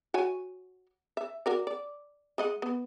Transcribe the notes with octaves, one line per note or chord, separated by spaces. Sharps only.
F#4 C#5 G#5
E5
F#4 A#4 D5
D5
G#3 D#5 F#5
B3